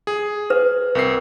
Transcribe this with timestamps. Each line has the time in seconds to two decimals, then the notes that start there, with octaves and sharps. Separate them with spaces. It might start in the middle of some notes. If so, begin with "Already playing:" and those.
0.07 G#4
0.50 B4
0.95 C2 C4 A#4 C7